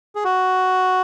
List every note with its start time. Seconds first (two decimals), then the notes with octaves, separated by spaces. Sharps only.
0.15 G#4
0.24 F#4